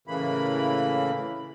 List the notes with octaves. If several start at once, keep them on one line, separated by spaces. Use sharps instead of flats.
A2 C#3 E3 A#3 B5